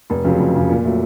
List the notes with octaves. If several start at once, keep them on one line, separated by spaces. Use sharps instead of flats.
F1
F2 C#3 F#3
F1
F2 C#3 F#3
A#2
F#3 A3